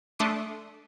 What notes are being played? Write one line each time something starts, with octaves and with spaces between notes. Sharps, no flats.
A3 D4 C6 D6 D#6 C#7